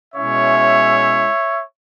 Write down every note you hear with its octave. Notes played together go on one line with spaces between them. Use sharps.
B2 G#3 C#4 E4 C#5 E5